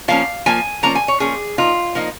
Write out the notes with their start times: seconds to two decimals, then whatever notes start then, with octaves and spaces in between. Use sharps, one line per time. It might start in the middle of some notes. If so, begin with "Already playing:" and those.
0.08 F3 A#3 C#4 F5
0.46 F3 A#3 G#5
0.83 F3 A#3 C#4 A#5
0.95 G#5
1.08 C#5
1.20 F3 A#3 C#4 G#4
1.58 F3 A#3 D#4 F4
1.95 F3 A#3 D#4